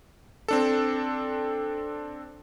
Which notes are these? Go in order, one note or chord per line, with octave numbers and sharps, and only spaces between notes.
C4 D4 A4